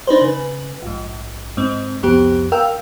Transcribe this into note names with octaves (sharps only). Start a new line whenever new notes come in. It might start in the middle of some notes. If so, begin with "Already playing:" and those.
D4 D#4 B4 C5
C#3 B4
A#1 G#2
G#2 C4
C2 F2 B3 G4
A#4 F5 G5 E6